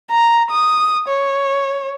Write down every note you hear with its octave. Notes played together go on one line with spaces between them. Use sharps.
A#5
D#6
C#5